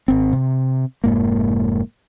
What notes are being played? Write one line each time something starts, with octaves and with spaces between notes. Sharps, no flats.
G#1 C4
C3
F1 G#2 A#3